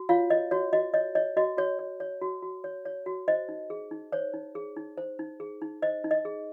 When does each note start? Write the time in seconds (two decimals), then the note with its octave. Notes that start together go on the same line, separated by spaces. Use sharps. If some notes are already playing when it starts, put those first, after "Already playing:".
Already playing: F#4
0.09 F4 C#5 F5
0.30 C#5 D#5
0.51 F#4 C#5
0.73 F#4 D#5
0.94 C#5 D#5
1.15 C#5 D#5
1.37 F#4 D#5
1.57 F#4 C#5
1.79 C#5
2.00 C#5
2.22 F#4
2.42 F#4
2.64 C#5
2.85 C#5
3.06 F#4
3.28 C5 D#5
3.49 D#4
3.70 G#4
3.91 D#4
4.12 C5 C#5
4.34 D#4
4.55 G#4
4.76 D#4
4.97 C5
5.19 D#4
5.40 G#4
5.62 D#4
5.82 C5 D#5
6.04 D#4
6.11 D#5
6.25 G#4